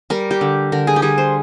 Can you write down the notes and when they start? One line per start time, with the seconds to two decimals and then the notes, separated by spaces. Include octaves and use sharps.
0.10 G3 A#4
0.31 G4
0.41 D3
0.72 D3 A#4
0.87 G#4
0.96 G4
1.02 G3 G#4
1.18 C5